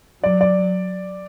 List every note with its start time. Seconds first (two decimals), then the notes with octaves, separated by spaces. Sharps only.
0.24 F#3 D5
0.41 D5